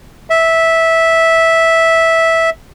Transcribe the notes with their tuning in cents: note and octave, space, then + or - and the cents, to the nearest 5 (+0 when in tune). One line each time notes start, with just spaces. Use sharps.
E5 -10